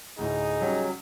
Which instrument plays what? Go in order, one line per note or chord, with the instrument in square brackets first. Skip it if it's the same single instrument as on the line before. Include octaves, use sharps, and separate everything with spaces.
[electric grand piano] D2 A2 [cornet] D#4 [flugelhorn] G#4
[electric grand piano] C#3 G3 C#4 [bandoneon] F#3